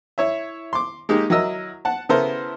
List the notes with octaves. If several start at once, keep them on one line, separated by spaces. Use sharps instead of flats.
E4 C#5 E5
C6 D6
G#3 A#3 D#4 G4
F#3 E4 A#4 D#5 E6
F#5 A5
C#3 B3 E4 A4 A#4 C5